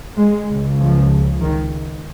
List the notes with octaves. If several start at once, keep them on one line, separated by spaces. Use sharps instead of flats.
G#3
C#2 C#3
F3
D#3